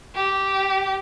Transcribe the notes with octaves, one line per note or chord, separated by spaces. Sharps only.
G4